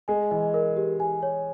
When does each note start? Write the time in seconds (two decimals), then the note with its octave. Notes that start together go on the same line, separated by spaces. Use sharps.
0.08 G#3 G#5
0.31 E3 D#5
0.54 A#4
0.77 G4
1.00 G#5
1.23 C#5